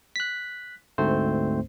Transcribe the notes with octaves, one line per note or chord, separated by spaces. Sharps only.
F#6 B6
D2 G#2 A3 C4 C5